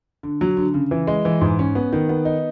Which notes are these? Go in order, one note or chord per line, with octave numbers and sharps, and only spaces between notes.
D3
F#3
D3
C#3
E3
G#3
E3
G#2
C#4
B3
D#3
B3
D#4